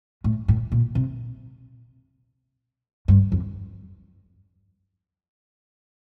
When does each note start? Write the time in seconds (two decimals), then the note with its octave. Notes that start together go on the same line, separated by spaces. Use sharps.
0.24 A2
0.48 A2
0.72 A#2
0.95 C3
3.08 G2
3.32 F2